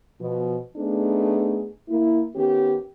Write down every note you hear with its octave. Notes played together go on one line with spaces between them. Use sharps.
B2 F3
A3 B3 D4 D#4 G#4
A#3 E4
D#3 B3 C#4 G4